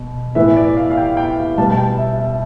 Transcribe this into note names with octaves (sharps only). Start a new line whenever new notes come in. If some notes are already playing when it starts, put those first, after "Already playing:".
Already playing: B2
A2 E3 B3 E5
D5
F5
F5
G5
G5
F5
B2 G3 B3 A5
A5
G5
E5
E5